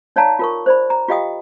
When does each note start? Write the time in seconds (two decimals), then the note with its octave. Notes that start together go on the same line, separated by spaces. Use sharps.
0.16 D#4 C#5 D5 F5 A5 A#5
0.39 F4 A#4 C#6
0.66 C5 D5 B5
0.90 A#5
1.08 F4 G4 D#5 F5 G5 D#6